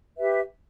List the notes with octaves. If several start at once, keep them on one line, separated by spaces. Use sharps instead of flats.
G4 B4 E5